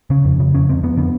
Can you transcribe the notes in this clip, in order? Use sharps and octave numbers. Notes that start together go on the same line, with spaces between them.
C#3 C#4
F2
C#3
F2 C#4
F2 C4
F2 B3
D3 B3